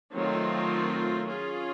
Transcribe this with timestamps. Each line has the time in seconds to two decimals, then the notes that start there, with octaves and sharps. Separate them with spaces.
0.15 D#3 F#3 A3 C4 F4
1.27 C#4 F4 G#4